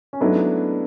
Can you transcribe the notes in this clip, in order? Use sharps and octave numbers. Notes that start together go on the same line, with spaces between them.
C#4
G#2 F#3 A3 B3 D4 E4